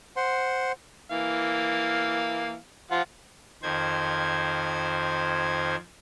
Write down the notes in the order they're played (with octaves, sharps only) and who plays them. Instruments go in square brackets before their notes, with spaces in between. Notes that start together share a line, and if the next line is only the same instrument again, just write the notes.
[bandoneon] C5 F#5 C6
[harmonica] E3 A#3 F5
F3 F4 F#5
[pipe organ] F2 D#3 C5 G#6